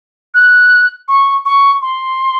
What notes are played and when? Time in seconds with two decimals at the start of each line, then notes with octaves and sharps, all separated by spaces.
0.34 F#6
1.08 C#6
1.45 C#6
1.82 C6